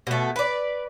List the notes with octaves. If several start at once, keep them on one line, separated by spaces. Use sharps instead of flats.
B2 A3
B4 D5